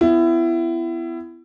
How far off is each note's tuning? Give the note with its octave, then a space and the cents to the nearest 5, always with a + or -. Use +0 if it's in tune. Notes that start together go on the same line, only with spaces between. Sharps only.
B3 +30 E4 +25